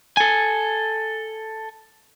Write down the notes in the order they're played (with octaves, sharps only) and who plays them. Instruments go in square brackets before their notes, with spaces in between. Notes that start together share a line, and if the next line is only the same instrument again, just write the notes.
[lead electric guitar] A4 G#5